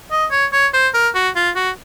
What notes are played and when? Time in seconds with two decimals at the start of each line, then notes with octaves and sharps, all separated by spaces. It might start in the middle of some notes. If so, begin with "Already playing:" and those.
0.11 D#5
0.31 C#5
0.52 C#5
0.74 C5
0.94 A#4
1.15 F#4
1.36 F4
1.56 F#4